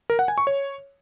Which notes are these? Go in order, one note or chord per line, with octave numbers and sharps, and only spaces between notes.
A#4
F#5
G#5
C#6
C#5